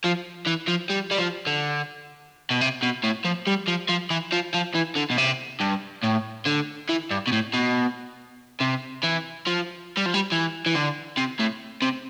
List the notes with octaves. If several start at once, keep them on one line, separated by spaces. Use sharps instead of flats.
F3
E3
F3
G3
G3
F3
D3
B2
C3
B2
A2
F3
G3
F3
F3
E3
F3
F3
E3
D3
B2
C3
G2
A2
D3
E3
G2
B2
A2
B2
C3
E3
F3
G3
F3
G3
E3
E3
D3
C3
A2
C3